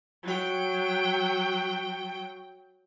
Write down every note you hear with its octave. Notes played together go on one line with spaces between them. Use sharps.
F#3 G5